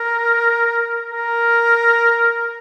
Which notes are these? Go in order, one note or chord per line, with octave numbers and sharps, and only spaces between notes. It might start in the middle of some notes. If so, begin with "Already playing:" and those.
Already playing: A#4
A#4